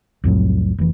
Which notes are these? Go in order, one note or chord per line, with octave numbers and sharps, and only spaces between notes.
C2 F2 A2 F#3
F1 E3